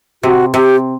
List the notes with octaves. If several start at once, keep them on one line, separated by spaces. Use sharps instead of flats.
C3 F#4
C3 G4